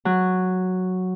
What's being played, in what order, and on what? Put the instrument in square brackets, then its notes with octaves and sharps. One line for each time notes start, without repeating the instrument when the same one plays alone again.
[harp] F#3